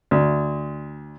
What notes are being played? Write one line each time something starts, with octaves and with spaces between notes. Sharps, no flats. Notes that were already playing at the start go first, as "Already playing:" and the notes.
D2